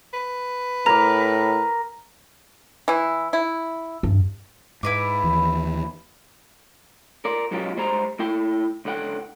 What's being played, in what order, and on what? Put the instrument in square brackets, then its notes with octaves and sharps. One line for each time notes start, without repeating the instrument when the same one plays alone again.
[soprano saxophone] B4
[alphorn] A2 [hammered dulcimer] A#4 D6 [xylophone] A#5
[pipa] E3 E4
E4
[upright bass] G2
[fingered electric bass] G#2 [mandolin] E4 B4 D6
[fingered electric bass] D#2 E3
[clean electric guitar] A#4 D5
B1 F#3 G#3 C#4 F4 G4
G#2 G3 G#3 C5 A#5
A2 E4 G5
C#2 D3 F#5 G5